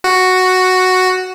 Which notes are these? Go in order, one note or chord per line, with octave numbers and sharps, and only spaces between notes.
F#4